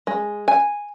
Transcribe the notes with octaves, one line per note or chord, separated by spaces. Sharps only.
G#3
G#5